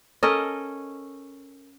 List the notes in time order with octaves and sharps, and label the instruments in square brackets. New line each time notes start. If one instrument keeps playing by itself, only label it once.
[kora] C#4 A4 A#4 D#5